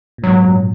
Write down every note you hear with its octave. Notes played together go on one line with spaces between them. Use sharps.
A#2
G#2 B2 F#3
F#2 A#2